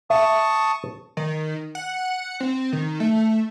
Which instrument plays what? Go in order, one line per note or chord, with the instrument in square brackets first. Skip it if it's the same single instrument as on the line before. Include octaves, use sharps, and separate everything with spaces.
[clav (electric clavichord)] E5 [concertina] A5 C#6 D#6
[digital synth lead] D#3
F#5
C4
D#3
A3